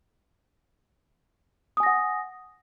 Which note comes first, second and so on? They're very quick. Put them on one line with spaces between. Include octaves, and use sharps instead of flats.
D#6 G#5 A#6 F#5